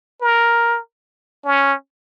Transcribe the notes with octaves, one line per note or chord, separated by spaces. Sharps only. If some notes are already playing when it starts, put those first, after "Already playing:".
A#4
C#4